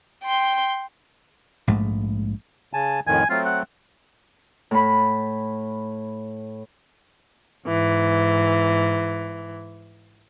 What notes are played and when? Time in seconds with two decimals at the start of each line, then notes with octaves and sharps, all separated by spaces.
0.23 G5 C6
1.68 A#1 G#2 G#3 A3
2.73 C#3 G#5 A5
3.07 F2 A2 D#3 G#5
3.30 F#3 A3 C4 F4
3.45 F#5
4.71 A2 B5
7.67 G#2 E3